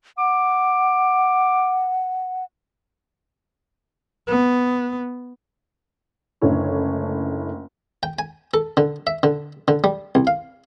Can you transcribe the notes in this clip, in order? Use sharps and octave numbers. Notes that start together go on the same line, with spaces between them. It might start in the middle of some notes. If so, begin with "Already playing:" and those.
F#5 D6
B3
F#1 C#2 D3 A3 E4 C#5
G5
G#5
A4
D3
E5
D3
D3
G3
C2
F5